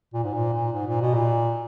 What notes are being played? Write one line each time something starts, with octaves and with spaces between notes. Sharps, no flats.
A#2
G#2
A#2
A#2
G#2
A#2
B2
A#2